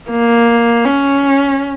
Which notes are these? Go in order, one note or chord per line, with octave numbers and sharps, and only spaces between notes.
A#3
C#4